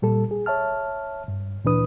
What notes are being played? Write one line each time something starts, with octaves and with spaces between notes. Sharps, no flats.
A#2 G3 A4
G#4
C#5 E5 A5 F6
G2
D2 A#2 E3 D4 B4 D#6